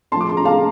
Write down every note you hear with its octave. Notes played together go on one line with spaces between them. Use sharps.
A2 F3 A5 C6
D6
C6
A#5
F5 A5